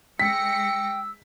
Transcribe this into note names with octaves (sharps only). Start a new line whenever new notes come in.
G#3 G5 E6 A#6 B6 C#7